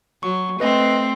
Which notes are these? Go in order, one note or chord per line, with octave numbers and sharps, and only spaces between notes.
F#3 C#6
A3 C4 B4 D#5